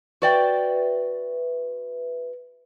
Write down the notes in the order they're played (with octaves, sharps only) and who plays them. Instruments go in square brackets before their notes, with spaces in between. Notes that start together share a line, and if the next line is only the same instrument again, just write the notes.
[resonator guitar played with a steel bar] F#4 D5 G5 [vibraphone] B4 E5